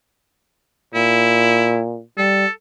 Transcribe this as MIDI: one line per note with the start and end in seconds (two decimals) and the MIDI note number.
0.95 2.02 46
0.95 1.81 64
2.17 2.45 55
2.17 2.50 69